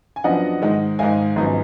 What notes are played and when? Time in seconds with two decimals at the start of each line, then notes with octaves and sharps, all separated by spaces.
0.16 G#5
0.24 F#2 F3 B3 D4 D#5 F#5
0.62 G#2 D#3 G#3 D#4
0.99 G#2 D#3 G#3 D#4 F5 G#5
1.36 G#1 F#2 F3 B3 D#4